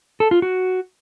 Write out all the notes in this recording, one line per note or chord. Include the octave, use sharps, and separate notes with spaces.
A4
F4
F#4